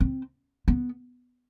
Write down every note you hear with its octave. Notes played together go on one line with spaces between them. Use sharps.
C4
B3